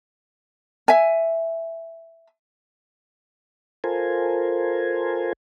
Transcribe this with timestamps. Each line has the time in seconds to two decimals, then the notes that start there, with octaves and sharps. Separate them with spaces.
0.88 E5 G#5
3.84 F4 A4 A#4 C5 G#5